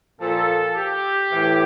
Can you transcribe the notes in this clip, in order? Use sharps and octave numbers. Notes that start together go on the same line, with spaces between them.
A#2 F3 A4
G4
A2 E3